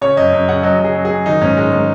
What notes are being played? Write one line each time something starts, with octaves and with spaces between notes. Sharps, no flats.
C#3 C#5
F#2 D#5
F#2
C#3 F#5
F#3 D#5
F#3
G#4
F#3
G#4
F#3
D#3 D#4
G#2 C#4
G#2 G#3
D#3 G#3